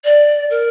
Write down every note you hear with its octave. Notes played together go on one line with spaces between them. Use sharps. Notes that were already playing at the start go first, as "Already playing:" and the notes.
D5
A#4